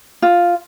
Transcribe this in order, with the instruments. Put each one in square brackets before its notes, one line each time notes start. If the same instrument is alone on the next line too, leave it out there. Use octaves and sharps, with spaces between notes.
[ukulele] F4